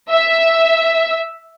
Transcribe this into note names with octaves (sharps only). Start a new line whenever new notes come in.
E5